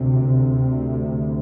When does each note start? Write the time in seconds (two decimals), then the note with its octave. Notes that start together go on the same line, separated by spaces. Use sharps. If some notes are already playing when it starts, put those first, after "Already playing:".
Already playing: D2 C3
0.52 D2 C3